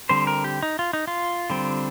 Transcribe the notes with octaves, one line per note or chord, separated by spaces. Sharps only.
D3 G3 C4 C5
A#4
G4
D#4
F4
D#4
F4
D3 G3 C4